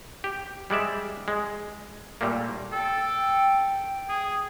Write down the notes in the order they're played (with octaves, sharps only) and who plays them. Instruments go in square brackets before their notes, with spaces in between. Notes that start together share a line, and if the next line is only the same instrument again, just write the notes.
[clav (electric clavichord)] G4
G3 G#3 D5 E5
G#3
A#2 G3 A3 A#3
[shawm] A4 [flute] G5
[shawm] G#4